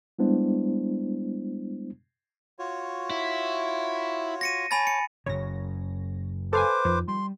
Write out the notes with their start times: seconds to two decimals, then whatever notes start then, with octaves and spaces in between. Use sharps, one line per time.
0.19 G3 G#3 B3 D4 E4 C5
2.59 F4 F#4 C#5
3.10 E4
4.41 A#6 C#7 D#7
4.71 C#5 G#5 A5 B5 A6
4.87 C#7
5.26 F#1 F#2 C#3 C#5 A#6
6.53 A4 B4 C5 F5 G#5 D6
6.85 F2 D#3 F3
7.08 G3 C6